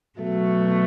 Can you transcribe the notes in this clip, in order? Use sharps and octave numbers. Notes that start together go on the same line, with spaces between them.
B2 F#3 A3